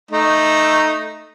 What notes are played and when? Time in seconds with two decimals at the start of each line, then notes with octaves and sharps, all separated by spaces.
0.11 A3 D#4